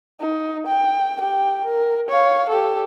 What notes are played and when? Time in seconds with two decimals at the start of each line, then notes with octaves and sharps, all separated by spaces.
0.20 D#4
0.67 G5
1.19 G4 G5
1.65 A#4
2.08 C#5 F5
2.50 G4 A4